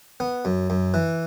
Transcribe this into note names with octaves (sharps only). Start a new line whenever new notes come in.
B3
F#2
F#2
E3